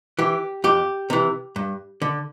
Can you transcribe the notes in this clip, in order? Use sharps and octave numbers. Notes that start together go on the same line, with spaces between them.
E3 G4
F2 G4
C3 E3
G2
D3